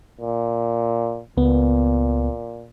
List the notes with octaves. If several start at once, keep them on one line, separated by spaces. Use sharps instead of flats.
A#2
C#2 A#2 B3